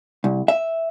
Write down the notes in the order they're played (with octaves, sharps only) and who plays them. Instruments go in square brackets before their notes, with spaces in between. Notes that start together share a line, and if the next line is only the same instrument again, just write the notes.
[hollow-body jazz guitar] C2
E5